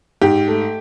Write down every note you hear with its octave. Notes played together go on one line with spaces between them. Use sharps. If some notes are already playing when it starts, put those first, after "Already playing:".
G#2 G4
A3